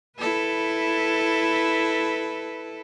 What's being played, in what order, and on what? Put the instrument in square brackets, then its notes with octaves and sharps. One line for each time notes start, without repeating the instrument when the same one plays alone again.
[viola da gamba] E4 A4 B4